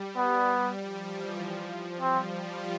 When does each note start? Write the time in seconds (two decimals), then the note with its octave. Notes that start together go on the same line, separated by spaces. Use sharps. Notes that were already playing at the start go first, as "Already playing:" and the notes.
Already playing: G3
0.17 B3
0.78 F3
1.09 E3
1.40 F3
1.69 F3
2.00 G3 C4
2.31 F4